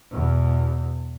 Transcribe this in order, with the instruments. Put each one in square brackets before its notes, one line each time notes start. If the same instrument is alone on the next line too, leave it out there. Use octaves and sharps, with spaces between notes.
[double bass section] E2 B2